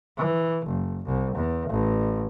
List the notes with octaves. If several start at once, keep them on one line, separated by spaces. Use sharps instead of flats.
E3
F#1
C2
E2
A1